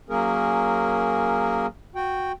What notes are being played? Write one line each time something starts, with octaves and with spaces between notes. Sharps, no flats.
F#3 A#3 C#4 G#4 A#4
F#4 G5